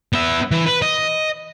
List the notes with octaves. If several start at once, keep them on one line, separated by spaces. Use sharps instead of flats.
B3 E5
E3
B4
D#5